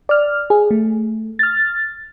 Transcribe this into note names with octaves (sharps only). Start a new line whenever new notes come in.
D5 F6
G#4
A3
F6 A6